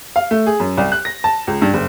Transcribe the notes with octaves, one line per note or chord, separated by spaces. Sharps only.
F5
A3
G#4
F#2
C2
F#6
A#6
A5
C#2
G2
F#1